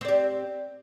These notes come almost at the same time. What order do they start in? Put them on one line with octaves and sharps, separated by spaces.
C4 D5 G4